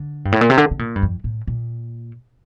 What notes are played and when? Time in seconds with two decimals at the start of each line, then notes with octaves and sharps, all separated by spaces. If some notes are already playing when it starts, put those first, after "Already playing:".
Already playing: D3
0.25 G2
0.32 A2
0.41 A#2
0.50 C3
0.58 D3
0.71 C3
0.79 A#2
0.96 G2
1.03 F2
1.24 A2
1.47 A#2